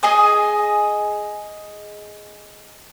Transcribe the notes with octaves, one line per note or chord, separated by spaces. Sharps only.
G#4 D#5 G#5 D#6